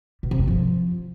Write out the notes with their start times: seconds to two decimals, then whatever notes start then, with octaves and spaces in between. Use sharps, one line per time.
0.23 B2
0.31 C3
0.39 G2
0.48 F3